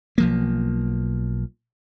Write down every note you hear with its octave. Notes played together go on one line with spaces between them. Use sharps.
B1 F3 A#3